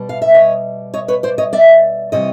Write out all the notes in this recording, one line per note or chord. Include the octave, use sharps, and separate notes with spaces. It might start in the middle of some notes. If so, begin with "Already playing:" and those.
Already playing: B2 G3
F5
E5
C#5 D#5
C#5 D#5
B4 C#5
C5 D5
C#5 D#5
D5 E5
C3 E3 G3 C#5 D#5